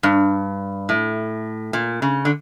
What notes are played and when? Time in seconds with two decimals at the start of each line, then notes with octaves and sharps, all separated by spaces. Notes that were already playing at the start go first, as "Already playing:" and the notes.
0.03 G2
0.89 A2
1.73 A#2
2.02 C#3
2.25 D3